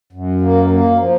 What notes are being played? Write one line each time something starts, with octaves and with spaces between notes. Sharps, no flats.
F#2
A#3
A#3
F3